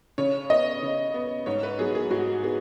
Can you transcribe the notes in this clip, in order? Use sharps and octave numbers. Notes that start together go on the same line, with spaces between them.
C#3 C#5
B3 D#5
C#3
B3
G#2 C#5
B4
F#3 B3 G#4
G#4
G#2 F#4
B3 G#4